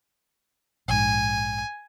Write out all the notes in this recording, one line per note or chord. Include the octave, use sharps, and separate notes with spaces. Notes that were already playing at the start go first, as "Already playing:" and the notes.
A#1 G#2 G#5